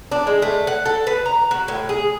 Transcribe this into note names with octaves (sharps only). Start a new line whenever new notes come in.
D4
G#3
A3
F#5
A4
B4
A#5
F#4
A2
G#4